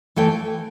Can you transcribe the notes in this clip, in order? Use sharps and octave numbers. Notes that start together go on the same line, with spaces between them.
E3 A3 E4 G5